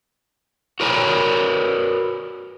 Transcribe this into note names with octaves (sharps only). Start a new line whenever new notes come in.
F#4 A#4 B4 C#5 A#5